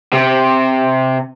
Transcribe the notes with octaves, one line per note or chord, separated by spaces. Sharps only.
C3